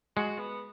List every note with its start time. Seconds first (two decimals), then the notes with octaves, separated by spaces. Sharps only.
0.16 G#3 F#4
0.38 B3